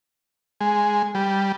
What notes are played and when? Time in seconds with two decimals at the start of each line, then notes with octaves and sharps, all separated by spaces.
0.61 G#3
1.15 G3